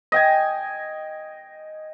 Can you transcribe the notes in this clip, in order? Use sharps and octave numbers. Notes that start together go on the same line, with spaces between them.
D#5 G5 G#5